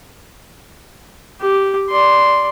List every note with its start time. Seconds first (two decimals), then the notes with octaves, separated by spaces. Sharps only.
1.41 G4
1.90 D5 C6